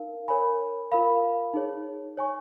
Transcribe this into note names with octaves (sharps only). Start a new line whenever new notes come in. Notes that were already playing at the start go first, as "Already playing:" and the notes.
Already playing: D#4 A#4 F5
A#4 C#5 G#5 B5
F4 A#4 F5 B5
D#4 G#4 C#5
C#5 G#5 C#6